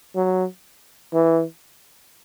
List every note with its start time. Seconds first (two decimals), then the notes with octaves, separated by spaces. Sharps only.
0.15 F#3
1.13 E3